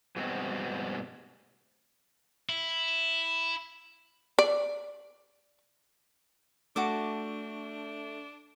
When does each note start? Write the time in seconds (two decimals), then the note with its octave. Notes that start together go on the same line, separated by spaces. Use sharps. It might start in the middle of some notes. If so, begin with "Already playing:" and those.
0.16 G2 B2 G#3 C4 F#4
2.49 E4
4.39 D5
6.76 A3 D4 F#4 A5 D6